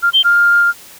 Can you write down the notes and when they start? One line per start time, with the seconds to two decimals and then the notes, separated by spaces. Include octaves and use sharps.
0.03 F6
0.13 G7
0.24 F6